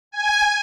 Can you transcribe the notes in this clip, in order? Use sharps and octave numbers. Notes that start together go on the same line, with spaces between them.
G#5